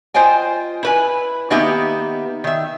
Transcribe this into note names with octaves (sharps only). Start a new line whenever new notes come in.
F4 C5 D#5 G5 G#5
E4 B4 G#5
D#3 A#3 B3 D#4 G4 E5
D#3 E5